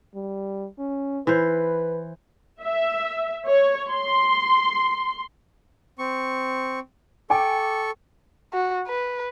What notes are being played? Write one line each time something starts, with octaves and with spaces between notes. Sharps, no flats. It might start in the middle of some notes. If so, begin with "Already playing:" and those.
G3
C#4
E3 B4 C5
E5
C#5
C6
C4 C#6
A4 G5 G#5 C#6 D6
F#4
B4